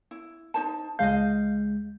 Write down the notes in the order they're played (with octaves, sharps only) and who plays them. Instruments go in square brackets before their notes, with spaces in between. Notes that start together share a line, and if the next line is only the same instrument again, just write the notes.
[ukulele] E4
D#4 C5 A5
[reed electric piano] C#2 G#3 G6 [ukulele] D#5 F5